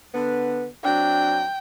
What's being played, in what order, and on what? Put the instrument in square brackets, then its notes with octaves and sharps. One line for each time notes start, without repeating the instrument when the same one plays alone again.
[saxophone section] D3 B3
[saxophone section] F#3 C4 D4 [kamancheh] G5